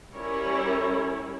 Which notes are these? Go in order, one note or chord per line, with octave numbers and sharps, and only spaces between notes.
G3 C#4 E4 A#4 C#5